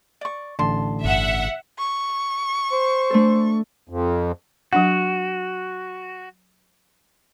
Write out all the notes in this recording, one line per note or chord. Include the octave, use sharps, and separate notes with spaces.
D5 C#6
A1 D3 A5 C6
G1 E5 F#5
C#6
C5
A3 D4 A4
F2
F#3 D4 F#4 F#5